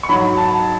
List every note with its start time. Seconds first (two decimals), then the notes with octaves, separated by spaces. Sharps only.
0.03 C#6
0.09 G#2 F#3 B5
0.37 A5